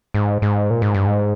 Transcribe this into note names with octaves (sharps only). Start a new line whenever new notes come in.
G#2
G#2
A#2
G#2
G2
G#2